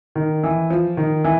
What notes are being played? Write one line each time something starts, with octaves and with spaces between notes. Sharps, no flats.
D#3
E3
F3
D#3
E3